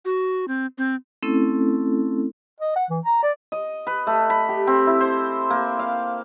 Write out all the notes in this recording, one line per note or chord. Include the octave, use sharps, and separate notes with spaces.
F#4
C4
C4
A3 C4 C#4 E4 A4
D#5
F#5
E3
A#5
D5
D#5
B4
A3
B5
G4
C4
E4
C5
A#3
F5